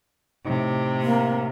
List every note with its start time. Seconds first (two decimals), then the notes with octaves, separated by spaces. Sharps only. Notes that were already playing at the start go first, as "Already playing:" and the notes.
0.45 A2 C3 D#4
1.02 A#3